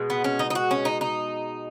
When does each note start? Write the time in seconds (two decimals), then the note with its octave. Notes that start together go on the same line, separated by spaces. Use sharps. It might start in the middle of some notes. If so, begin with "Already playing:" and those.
Already playing: B2 G#3
0.10 B3
0.24 C#4
0.39 D#4
0.50 D#4
0.55 F#4
0.71 C#4
0.85 D#4
1.01 D#4